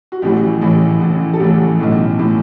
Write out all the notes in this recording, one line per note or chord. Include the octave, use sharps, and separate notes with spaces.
F#4
A1 A2 E3 G4
A1 A2 E3
A1 A2 E3
A4
A1 A2 E3 G4
B1 A2 E3
A2 E3